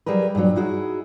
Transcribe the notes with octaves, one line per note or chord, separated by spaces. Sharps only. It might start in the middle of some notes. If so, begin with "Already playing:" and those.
F#3 G3 G#4 A#4 B4
G2 A#2 E3 F#3
D#4 E4 F#4 G#4